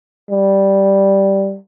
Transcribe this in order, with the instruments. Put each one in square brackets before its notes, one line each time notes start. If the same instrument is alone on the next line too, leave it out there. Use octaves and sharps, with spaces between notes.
[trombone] G3